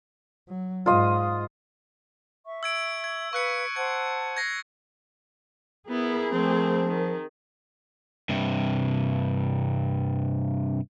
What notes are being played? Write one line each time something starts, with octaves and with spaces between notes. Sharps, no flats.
F#3
G#2 F4 D#5
E5 C#6
E6 G#6 D7
G#6
B4 F5 C#6 F#6 C#7
C5 F#5 A5 G#6
G#6 A#6 C7
B3 E4 G#4 A#4
F3 A3 C4
D#3
G2 C3